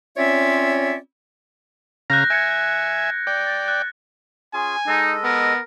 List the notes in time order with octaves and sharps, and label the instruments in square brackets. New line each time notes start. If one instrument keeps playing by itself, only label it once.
[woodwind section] C4 C#4 F4 C#5 D5 E5
[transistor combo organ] C#3 F5 A#5 [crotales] F#6 G6 A#6
[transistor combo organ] E5 G#5 [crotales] G#6 C#7 D7
[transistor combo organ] D5 G5
[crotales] A6
F#6
[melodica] C#4 F4 G#4 [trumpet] G#5
[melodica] G#3 A4 D#5 [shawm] D#4
[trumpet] B3 [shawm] A#4